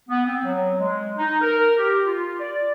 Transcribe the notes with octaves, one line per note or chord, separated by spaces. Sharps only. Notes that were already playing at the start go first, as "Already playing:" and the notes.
B3
C4
F#3
G#3
D#4
A#4
G4
F4
D5